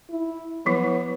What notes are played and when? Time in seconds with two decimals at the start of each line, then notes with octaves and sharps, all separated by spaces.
0.10 E4
0.66 F3 F#3 B3 E4